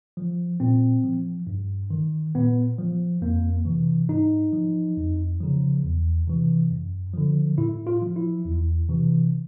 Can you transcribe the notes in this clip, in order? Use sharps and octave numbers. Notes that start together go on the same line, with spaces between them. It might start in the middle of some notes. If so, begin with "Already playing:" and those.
F3
A#2 C4
F3
G2
D#3
A#2 B3
F3
F2 A#3
C3 E3
G#2 D#4
F3
F2
C#3 F3
E2
C3 E3
F#2
D3 F3
A2 E4
F4
F3
E4
E2
C3 E3